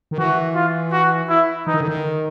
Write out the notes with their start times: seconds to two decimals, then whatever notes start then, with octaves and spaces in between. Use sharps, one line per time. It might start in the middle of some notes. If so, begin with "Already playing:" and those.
0.11 D#3
0.18 E3 F#4
0.55 F4
0.92 F#4
1.29 E4
1.67 E3 D#4
1.74 D#3
1.81 D3
1.88 D#3